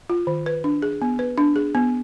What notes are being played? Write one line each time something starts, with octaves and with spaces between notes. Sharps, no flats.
F4
D#3
B4
D4
G#4
B3
B4
D4
G#4
B3